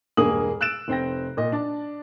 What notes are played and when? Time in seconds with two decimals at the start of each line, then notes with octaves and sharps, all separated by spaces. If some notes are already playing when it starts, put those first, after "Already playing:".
0.17 E1 G2 A#3 G#4 D#6 F#7
0.61 E6 F#6 A6 D7 E7
0.88 F1 C4 G5 A#6
1.37 A#2 D#5
1.52 D4 D5 A5